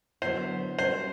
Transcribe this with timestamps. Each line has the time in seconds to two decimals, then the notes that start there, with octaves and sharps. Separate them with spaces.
0.22 D3 F#3 B3 E4 C5
0.79 G3 A#3 C#4 C5